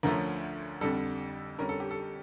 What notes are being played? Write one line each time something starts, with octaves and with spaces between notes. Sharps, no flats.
D2 D3 F3 A3 C#4 A#4
F2 D3 G3 A4
F2 D3 G3 C#4 A#4
A4
G4
A4